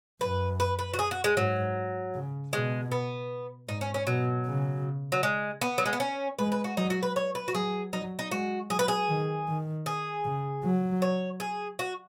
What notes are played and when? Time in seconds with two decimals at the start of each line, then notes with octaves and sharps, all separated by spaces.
0.21 F#2 B4
0.60 B4
0.79 B4
0.94 F#4
0.99 G#4
1.11 F#4
1.24 G#3
1.37 G#2 F#3
2.14 C#3
2.53 B2 G#3
2.92 B3
3.68 G#2 D#4
3.81 C#4
3.94 C#4
4.07 B2 F#3
4.46 C#3
5.12 F#3
5.23 G#3
5.61 B3
5.78 F#3
5.86 G#3
5.93 B3
6.00 C#4
6.39 G#3 B4
6.52 B4
6.64 F#4
6.77 F#3 D#4
6.90 F#4
7.03 B4
7.16 C#5
7.35 B4
7.48 F#4
7.55 F#3 G#4
7.93 F#3 D#4
8.19 D#4
8.31 G#3 F#4
8.70 F#3 G#4
8.79 B4
8.88 G#4
9.09 D#3
9.48 D#3
9.86 G#4
10.25 C#3
10.64 F#3
11.02 C#5
11.40 G#4
11.79 F#4